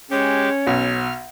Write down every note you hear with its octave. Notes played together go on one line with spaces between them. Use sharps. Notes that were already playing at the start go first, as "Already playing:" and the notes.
G#3 C#4 G4 C#5
B1 F6